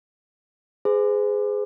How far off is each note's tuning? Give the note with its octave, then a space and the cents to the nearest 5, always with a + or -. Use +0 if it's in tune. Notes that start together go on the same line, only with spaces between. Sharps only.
G#4 +0 C5 -45